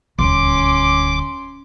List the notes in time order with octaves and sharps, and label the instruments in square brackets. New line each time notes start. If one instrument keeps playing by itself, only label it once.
[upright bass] D#1 D2 [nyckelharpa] C#4 C6 [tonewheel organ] D6